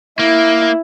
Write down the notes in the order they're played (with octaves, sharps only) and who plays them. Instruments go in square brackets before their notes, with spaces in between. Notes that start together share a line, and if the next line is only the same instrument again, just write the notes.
[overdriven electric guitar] A#3 [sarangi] E4